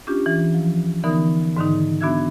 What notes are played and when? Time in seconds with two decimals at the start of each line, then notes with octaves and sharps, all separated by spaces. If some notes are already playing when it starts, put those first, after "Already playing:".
0.07 C#4 D4 F4 G4
0.26 E3
0.54 F3
1.04 D3 E3 B3 D#4 A#4 D#6
1.56 G#2 D3 D#3 D#4
2.01 B3 D4 F#4 E5 E6 G#6